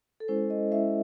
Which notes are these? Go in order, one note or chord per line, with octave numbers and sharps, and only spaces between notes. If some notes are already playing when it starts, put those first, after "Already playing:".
A4
G#3 C#4 E4 C5
D#5
G#3 C#4 E4 E5